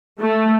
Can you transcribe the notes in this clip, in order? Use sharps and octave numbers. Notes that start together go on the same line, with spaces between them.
A3